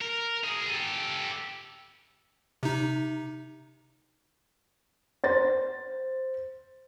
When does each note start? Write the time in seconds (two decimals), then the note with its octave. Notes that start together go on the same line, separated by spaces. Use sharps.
0.01 A#4
0.44 G#4 A#4
0.70 G4 A4
2.63 C3 D#4
5.24 C5 A6